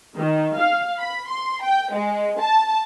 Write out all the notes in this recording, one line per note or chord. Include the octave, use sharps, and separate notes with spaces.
D#3
F5
B5
C6
G5
G#3
A5